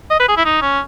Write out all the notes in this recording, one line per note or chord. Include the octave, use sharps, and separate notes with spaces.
D#5
B4
G#4
E4
D#4
C#4